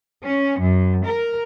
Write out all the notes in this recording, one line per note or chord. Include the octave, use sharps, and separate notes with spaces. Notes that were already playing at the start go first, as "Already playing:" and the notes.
C#4
F#2
A#4